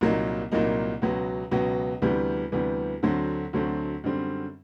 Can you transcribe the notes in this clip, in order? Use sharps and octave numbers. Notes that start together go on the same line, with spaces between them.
C2 A#2 F#3 A#3 D#4
C2 A#2 F#3 A#3 D#4
C#2 B2 F#3 B3
C#2 B2 F#3 B3
D2 C3 E3 G3 B3
D2 C3 E3 G3 B3
D2 D3 F#3 A3 C4
D2 D3 F#3 A3 C4
F#2 D3 G3 C4